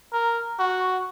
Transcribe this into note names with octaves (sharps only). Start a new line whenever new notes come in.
A#4
F#4